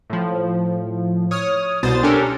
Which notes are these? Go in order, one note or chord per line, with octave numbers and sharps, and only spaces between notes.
A2 F3
C#5 D#6 F6
C2 B2 C5 D#6 A6
C#4 D4 G4 A4 A#4